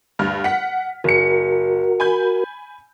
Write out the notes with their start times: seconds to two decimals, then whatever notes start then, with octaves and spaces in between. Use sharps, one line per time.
0.19 D2 G2 F6
0.44 F#5 B6
1.04 F#1 F#4 A#4 C#7
2.00 G#5 B5 G6